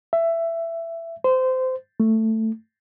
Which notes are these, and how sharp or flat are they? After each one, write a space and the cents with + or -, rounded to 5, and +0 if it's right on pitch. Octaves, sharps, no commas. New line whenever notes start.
E5 +15
C5 -20
A3 +10